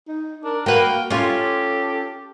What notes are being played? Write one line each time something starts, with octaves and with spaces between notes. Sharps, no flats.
D#4
D4 A#4
A#3 F#4 B4 G5
C#4 F4 G4 A4